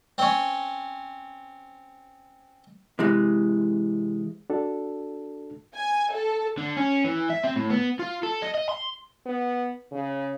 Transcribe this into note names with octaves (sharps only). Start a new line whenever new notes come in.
C4 C#4
C3 E3 G#3
D4 F#4 A4
G#5
A4
D3
C#4
E3
E5
C4
A2
B3
F4
A4
D#5
D#5
C6
B3
C#3